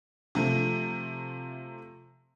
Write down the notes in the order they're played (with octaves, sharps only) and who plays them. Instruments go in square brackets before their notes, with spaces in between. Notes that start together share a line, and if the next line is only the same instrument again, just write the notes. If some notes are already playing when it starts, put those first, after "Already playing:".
[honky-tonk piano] C3 F3 A3